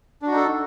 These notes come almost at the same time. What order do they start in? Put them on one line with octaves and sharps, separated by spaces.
D4 F#4 D#4 A4